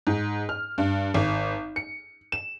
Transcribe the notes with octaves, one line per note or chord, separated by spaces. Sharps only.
G#2
F6
G2
G#1
C#7
E7